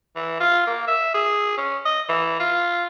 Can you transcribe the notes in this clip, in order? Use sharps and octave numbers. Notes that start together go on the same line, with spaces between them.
E3
F4
A#3
E5
G#4
C#4
D#5
E3
F4